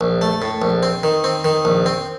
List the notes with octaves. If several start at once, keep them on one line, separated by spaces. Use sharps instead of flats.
A#1
A3
A2
A#1
C4
D#3
C4
D#3
A#1
C4